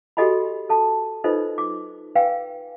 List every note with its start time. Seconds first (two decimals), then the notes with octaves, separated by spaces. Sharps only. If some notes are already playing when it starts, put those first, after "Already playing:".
0.17 F#4 G4 A4 D#5 G#5 B5
0.69 A4 A5
1.24 D#4 F4 A4 B4 C5 D#5
1.58 D6
2.15 B4 F5 G5 G#5